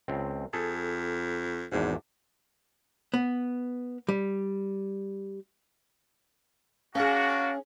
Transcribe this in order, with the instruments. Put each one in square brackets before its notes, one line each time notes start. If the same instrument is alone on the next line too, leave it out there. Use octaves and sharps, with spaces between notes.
[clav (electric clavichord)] C#2 C4
[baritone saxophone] F2 [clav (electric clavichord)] G#4 A4
[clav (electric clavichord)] G#1 E2 D4 [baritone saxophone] G#2
[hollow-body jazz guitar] B3
G3
[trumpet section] A#3 D4 F#4 [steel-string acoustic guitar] C#4 G#4 [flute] F5